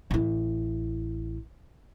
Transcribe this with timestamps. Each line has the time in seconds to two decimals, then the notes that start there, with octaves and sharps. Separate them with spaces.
0.11 A1 E4